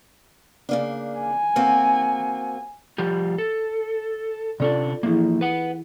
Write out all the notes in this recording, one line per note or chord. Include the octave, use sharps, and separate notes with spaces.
C#3 A#3 D4
G#5
A#3 C4 F#4
F3 G3 G4
A4
C3 C#4 D4 F4 A4 D5
E3 F3 A#3 E4 G#4
B4 F#5